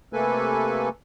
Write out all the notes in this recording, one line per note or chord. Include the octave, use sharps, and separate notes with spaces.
C3 A3 A#3 A4 B4 G#5